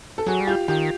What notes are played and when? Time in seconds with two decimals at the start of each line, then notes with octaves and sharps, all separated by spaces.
0.18 A4
0.26 F#3 F#4 G#4
0.41 G3
0.47 F4 G4
0.68 D#3 F4 G4